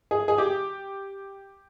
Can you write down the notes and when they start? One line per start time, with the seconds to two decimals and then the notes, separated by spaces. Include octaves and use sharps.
0.11 G#4
0.28 G#4
0.38 G4